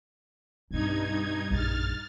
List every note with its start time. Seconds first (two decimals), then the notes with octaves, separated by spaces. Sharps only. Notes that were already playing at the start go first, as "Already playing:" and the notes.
0.71 B1 G2 C4 D#4 G#6
1.51 A#1 F#2 F6 A6